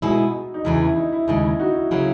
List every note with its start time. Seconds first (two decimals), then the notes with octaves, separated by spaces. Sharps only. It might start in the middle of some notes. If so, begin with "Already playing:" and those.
0.02 B2 G#3 B3 D#4 E4 F#4
0.54 D#4
0.65 E2 C#3 E3 E4
0.81 E4
0.96 D#4
1.12 E4
1.28 D#2 C#3 G#3 D#4
1.43 E4
1.60 D#4 F#4
1.74 E4
1.91 C#3 F#3 A#3 E4